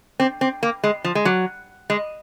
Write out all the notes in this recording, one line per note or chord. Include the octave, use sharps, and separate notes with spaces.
C4
C4
A#3
G#3
F3
G#3
F#3
G#3